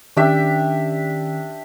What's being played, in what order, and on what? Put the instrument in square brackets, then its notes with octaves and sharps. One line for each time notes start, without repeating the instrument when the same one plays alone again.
[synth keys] D#3 C#4 [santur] D4 G4 E5